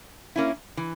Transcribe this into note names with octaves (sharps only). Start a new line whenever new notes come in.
A#3 C#4 E4
E3